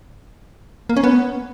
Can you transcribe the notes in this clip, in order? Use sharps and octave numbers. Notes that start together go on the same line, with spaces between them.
A#3
C#4
B3